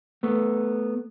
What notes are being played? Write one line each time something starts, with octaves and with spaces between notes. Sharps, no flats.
A3 B3